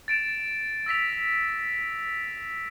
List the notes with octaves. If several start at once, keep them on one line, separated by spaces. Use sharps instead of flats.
A6 D7 E7
E6 A#6 B6 F7